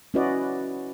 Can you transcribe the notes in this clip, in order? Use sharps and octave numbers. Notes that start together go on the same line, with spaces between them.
C#4 E4 F#4 B4 D5 D#5